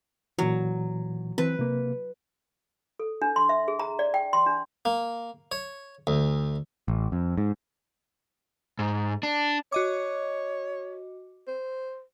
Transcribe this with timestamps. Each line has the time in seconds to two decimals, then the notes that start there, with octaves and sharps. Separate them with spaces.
0.39 A#2 E3 F#3
1.38 E3 C4 B4
1.59 C3 A#3
3.00 A4
3.22 D4
3.36 C6
3.49 E5
3.68 G#4
3.79 A#5
3.99 D5
4.14 G5
4.33 C6
4.46 D4
4.85 A#3
5.52 C#5
6.07 D2
6.88 A1
7.12 F2
7.37 G#2
8.79 G#2
9.23 D4
9.72 F#4 C#5 D#5 D6
11.48 C5